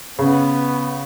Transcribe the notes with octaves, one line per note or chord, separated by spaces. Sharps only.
C#3 B3